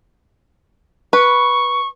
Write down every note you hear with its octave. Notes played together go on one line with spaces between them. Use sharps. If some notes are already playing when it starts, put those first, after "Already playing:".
B4 C#6